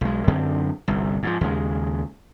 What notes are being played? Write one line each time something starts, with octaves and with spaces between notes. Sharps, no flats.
B1 G#3
F#2 D3 C4
G1 C2
G#2 B2 F3
D#2 C#3 G#3